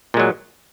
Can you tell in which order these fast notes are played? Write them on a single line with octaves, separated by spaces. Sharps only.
A#2 G#3 F#3